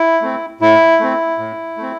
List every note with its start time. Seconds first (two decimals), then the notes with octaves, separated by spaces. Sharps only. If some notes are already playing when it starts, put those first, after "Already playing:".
Already playing: E4
0.22 A3 C4
0.61 A2 E4
1.00 A3 C4
1.38 A2
1.77 A3 C4